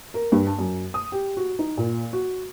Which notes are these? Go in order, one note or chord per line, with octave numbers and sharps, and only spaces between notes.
A#4
G2
A5
F#2
D#6
G4
F#4
D#4
A#2
F#4